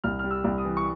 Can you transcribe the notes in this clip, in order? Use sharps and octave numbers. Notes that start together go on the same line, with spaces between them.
C2 F6
G3 F6
E6
C2
D#6
E3
C#6